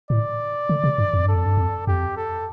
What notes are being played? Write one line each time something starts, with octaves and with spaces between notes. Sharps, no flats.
A2 D5
D3
C3
G2
F2
G2 A4
F2
G2
F2
F2 G4
A4